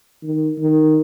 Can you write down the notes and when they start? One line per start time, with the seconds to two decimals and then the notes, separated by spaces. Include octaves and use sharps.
0.22 D#3
0.59 D#3